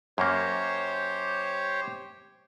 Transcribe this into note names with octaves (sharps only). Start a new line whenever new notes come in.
F#2 A#3 G4 C5 C#5